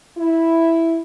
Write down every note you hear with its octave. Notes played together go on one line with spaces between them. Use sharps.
E4